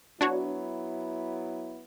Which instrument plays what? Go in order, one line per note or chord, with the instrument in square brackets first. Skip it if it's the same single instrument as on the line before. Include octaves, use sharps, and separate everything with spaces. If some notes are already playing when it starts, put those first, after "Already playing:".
[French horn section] F#3 B3 E4 [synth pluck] D4 F#4 C#5